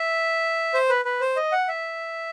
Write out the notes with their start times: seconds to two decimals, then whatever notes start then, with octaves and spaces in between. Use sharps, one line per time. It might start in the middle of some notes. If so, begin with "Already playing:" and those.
Already playing: E5
0.74 C5
0.89 B4
1.05 B4
1.21 C5
1.36 D#5
1.52 F#5
1.68 E5